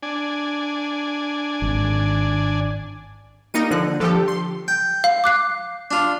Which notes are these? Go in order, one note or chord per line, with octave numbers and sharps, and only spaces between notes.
D4 G#5
G#1
G3 A#3 D#4 A#6 C#7 D#7
D3 F3 F#6
D3 F3 G4 A4
C6
G5
F5
D6 F#6 C7
D4 F4